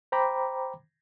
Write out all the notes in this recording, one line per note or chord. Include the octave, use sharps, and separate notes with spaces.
C5 G5 A#5 B5 D6